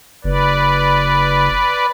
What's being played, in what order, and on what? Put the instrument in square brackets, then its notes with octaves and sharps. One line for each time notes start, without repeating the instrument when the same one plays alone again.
[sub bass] F#1 [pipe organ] B4 D5